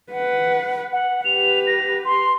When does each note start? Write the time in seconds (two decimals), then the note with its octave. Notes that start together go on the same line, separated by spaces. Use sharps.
0.12 B4 F#5
0.93 F#5
1.25 G4 B4 F7
1.67 A#6
2.05 C6